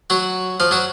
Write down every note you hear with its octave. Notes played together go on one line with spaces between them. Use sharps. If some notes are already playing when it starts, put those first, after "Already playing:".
F#3 F#4
F3 F4
F#3 F#4